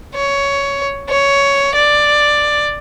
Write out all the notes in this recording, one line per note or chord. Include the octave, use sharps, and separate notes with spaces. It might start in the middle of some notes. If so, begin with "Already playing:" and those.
C#5
C#5
D5